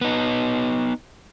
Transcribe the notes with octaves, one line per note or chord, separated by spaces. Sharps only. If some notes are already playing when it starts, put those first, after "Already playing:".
B3 D#4